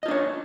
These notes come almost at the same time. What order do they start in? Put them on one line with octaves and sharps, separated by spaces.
D#5 F4 D4 C#5